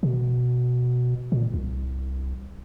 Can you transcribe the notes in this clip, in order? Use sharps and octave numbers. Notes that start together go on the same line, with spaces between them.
B2
A#2
C2